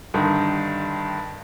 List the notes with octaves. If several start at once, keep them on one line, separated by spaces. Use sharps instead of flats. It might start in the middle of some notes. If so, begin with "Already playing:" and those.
G2 D3 D#3